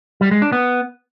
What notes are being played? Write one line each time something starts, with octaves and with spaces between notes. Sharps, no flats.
G3
G#3
D4
B3